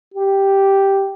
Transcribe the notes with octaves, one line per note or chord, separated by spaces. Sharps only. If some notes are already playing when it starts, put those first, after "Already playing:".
G4